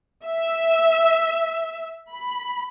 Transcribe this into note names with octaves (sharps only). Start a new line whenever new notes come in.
E5
B5